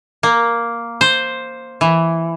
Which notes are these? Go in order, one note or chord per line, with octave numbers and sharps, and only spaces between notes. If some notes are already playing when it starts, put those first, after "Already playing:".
A#3
C5
E3